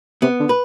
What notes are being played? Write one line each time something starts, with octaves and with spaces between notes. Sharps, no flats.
C3 B3
D3
B4